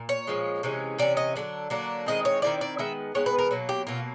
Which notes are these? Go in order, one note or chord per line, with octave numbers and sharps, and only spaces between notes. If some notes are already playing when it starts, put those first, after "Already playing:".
Already playing: A#2
C#5
A#2 F3 G#3 C#4
C3 E3 G#3 C#4
C3 E3 C#4 D5
D#5
D3 F#3 A#3 D4
D3 F#3 A#3 D4
D#3 G#3 C4 E4 D#5
C#5
D#3 G#3 C4 E4 D5
D5
D#3 G#3 B3 E5
D#3 G#3 B3 C#5
B4
A#4
B2 F#3 A#3
G4
B2 F#3 A#3 F4